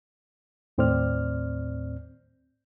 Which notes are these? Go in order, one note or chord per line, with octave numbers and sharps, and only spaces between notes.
D#2 A2 C4 C5 D5 F6